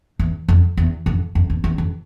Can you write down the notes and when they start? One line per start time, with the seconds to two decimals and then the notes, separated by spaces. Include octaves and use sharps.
0.19 E2
0.49 F2
0.77 E2
1.06 F2
1.35 F2
1.50 E2
1.64 E2
1.78 F2